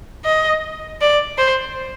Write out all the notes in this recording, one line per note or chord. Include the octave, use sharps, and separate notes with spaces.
D#5
D5
C5